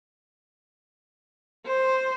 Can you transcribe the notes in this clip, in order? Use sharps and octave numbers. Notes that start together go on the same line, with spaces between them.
C5